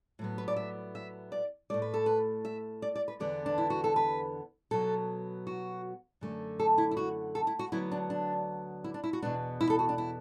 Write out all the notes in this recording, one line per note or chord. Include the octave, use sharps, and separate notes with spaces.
A2 F#3 B3
B4
D5
E5
E5
D5
A2 A3 D5
B4
A4
B4
E5
D5
D5
B4
E2 D3 B3 D5
D4
E4
F#4
A4
B4
B2 F#3 B3 A4
F#4
F#2 D3 A3
A4
E4
E4
F#4
A4
E4
F#4
D2 D3 F#3 B3 E4
D4
D4
E4
D4
E4
F#4
E2 B2 B3 D4
E4
A4
F#4
D4
E4